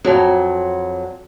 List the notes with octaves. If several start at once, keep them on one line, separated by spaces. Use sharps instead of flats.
F2 F#3